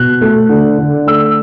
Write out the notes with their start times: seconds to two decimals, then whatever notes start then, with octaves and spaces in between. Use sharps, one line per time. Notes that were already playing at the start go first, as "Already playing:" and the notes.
Already playing: B2 F#6
0.21 A3
0.49 D3
0.78 D3
1.07 A3 E6